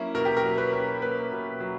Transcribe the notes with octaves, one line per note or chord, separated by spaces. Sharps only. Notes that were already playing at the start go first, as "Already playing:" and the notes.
Already playing: F#3 A#3 C#4 E4
B2 A#4
G4
A#4
F#3
B4
C#4
A#3 B4
B2
F#3